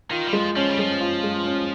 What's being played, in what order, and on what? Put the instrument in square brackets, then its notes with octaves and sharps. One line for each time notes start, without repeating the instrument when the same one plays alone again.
[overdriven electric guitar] D#3 [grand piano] F4
[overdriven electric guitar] G3
[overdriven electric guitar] F3 [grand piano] G#3
[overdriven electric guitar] F3 [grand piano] C#4
[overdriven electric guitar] G3
[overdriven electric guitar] F3 [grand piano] G#3
[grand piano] F4
G#3
C#4